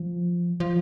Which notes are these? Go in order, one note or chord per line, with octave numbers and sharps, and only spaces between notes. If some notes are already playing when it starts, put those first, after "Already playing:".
Already playing: F3
F3